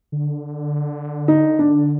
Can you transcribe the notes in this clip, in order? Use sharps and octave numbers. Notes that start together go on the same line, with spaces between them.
D3
D#4
D4